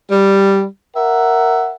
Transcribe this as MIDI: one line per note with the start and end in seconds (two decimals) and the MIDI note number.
0.12 0.65 55
0.97 1.75 70
0.97 1.75 76
0.97 1.75 78